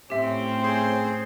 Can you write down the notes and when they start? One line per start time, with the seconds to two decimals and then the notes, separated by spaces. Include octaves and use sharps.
0.10 A2 C4 C#4 G4 E5
0.62 G#4 C5 C6